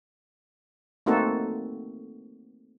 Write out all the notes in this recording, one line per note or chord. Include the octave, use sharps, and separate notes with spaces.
A3 A#3 C4 D#4 F#4 A4